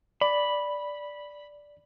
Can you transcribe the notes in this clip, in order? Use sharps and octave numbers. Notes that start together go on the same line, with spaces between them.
D5 B5